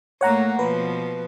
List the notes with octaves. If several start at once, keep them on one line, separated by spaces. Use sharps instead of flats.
A2 A3 A#3 C#5 F#5 A#5
B2 F3 B4